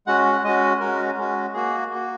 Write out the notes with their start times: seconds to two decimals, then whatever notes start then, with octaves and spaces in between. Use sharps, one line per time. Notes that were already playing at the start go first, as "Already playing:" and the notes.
0.07 G#3 C#4 F#4 F#5
0.33 F#5
0.44 G#3 C#4 F#4 D#5
0.80 G#3 C#4 F#4 A#4
1.18 G#3 C#4 F#4
1.54 A#3 F#4 G#4
1.91 A#3 F#4